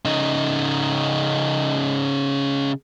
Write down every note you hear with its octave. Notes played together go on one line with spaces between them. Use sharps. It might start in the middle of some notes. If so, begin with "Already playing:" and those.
C#3 D#4